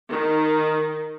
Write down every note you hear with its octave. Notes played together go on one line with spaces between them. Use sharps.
D#3